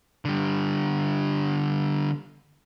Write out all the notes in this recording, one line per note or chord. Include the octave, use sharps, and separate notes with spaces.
D3 G3